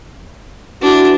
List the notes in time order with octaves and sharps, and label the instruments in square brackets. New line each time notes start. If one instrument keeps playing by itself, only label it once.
[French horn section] E3 F#4 [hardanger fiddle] D4